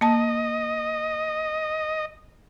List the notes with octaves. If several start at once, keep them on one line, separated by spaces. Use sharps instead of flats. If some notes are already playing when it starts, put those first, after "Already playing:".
A#3 D#5 A5